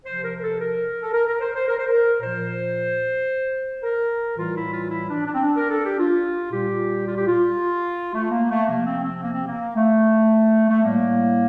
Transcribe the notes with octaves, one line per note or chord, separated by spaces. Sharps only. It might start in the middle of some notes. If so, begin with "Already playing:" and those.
C3 F3 C5
A#4
A#4
A4
A#4
A4
A#4
A#4
C5
C5
A#4
C5
A#4
A#2 F3 C5
A#4
A2 E3 G3 F4
E4
F4
E4
D4
D4
C4
D4
A#4
A4
G4
F4
A#2 G3 G4
F4
G4
F4
A3
A#3
A3
C3 F3 A#3
C4
C4
A#3
C4
A#3
A3
A3
A2 G3 A#3